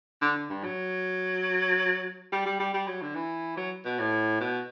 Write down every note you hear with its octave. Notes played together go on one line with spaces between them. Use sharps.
D3
D3
G2
F#3
G3
G3
G3
G3
F#3
D3
E3
F#3
B2
A2
B2